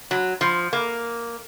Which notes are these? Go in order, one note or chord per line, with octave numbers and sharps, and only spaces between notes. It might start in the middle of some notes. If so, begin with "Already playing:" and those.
F#3
F3
A#3